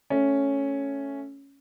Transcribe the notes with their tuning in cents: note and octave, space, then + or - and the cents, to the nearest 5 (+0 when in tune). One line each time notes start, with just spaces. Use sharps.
A3 +0 C#4 +0